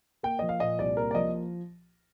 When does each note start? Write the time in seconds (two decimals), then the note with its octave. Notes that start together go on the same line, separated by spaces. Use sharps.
0.23 A#3 G5
0.39 F3 D#5
0.49 F5
0.60 A#2 D#5
0.79 C2 D5
0.97 A#3 A#4
1.11 D5
1.15 F3 D#5